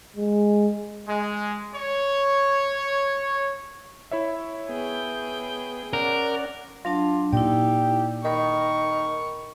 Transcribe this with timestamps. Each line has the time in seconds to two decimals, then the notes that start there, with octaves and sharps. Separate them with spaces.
0.17 G#3
1.08 G#3
1.75 C#5
4.11 E4 C#5 E5
4.69 B3 G#4 G5
5.93 C#4 A#4 D5 F#5
6.85 F#3 D4 F4 A5
7.33 A#2 D#4 E4 G4 D5
8.25 D#3 A#4 B5 C#6